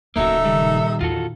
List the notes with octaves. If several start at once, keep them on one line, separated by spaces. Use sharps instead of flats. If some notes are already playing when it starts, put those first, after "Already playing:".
D1 C#3 A#3 D#4 F#4 A4 E5
A#2 D#3 G3
E2 F4 F#4 A4